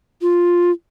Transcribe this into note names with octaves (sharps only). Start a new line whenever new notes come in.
F4